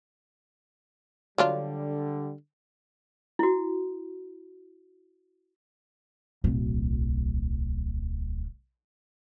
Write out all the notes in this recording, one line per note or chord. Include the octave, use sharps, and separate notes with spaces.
D3 F#3 G3 D4 F4
E4 F#4
D1 B1